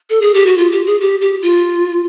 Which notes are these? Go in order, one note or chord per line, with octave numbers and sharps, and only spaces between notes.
A4
G#4
G4
F#4
F4
G4
G#4
G4
G4
F4